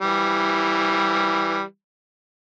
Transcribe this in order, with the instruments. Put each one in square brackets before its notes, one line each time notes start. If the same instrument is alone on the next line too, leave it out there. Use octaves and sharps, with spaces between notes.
[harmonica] E3 G3